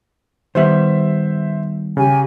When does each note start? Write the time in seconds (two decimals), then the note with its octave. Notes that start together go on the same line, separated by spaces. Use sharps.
0.55 D#3 G3 B3 C5 E5
1.97 C#3 G4 G#5